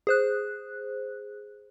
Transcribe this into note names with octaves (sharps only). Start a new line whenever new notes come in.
G#4 C5 F#6